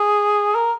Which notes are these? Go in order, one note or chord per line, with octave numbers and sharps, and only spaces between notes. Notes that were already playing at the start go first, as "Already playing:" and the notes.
Already playing: G#4
A#4